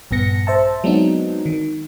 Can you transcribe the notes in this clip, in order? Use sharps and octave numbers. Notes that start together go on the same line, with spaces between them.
A#1 G2 B3 A#6 C#7
C5 E5 A5
F#3 G#3 B3 C4 D4 D#4
D#3